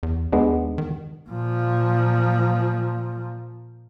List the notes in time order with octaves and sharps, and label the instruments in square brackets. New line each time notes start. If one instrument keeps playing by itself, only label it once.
[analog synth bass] E2
[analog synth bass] D#2 [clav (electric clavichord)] G#3 B3 D4
[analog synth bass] D#3
[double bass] A#2 F3